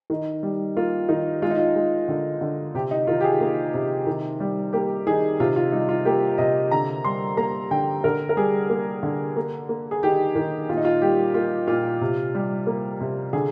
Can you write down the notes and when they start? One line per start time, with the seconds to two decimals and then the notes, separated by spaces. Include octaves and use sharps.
0.10 D#3
0.43 G3
0.76 A#3 F4
1.09 D#3 D#4
1.42 G#3 F4
1.51 D#4
1.58 F4
1.76 G#3
2.08 D3
2.41 D3
2.75 C3 G4
2.91 D#4
3.07 D#3 F4
3.21 G4
3.24 G#4
3.41 A#3
3.74 C3
4.07 D#3
4.40 G3
4.73 A#3 G4
5.07 D#3 G#4
5.40 C3 F4
5.56 F4
5.72 G3 D#4
5.89 F4
6.05 A#3 G4
6.38 C3 D#5
6.71 D3 A#5
7.04 G3 C6
7.37 A#3 A#5
7.71 D3 G5
8.04 D3 A#4
8.29 A#4
8.37 G3 G#4
8.70 A#3
9.03 D3
9.36 A#3
9.69 A#3
9.91 G#4
10.03 D#3 G4
10.35 D#3
10.69 A#2 F4
10.77 D#4
10.85 F4
11.02 G3 G4
11.34 A#3 F4
11.67 A#2 F4
12.01 C3
12.35 G3
12.67 A#3
13.01 C3
13.33 D3 G#4